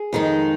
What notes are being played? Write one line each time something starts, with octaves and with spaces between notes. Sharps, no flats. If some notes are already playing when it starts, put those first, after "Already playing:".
Already playing: G#4
F2 D#3 G#3 D#4